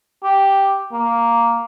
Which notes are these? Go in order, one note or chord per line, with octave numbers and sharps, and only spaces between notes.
G4
A#3